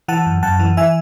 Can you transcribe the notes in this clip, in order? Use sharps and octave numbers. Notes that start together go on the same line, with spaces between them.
E3 F#5 A5
F#2
F#2 F#5 A5
E3
E3 E5 G#5